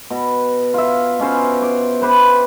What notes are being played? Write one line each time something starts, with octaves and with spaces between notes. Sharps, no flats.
B2
F4 E5
B2 C#4 C5
D6
G4 B4 C5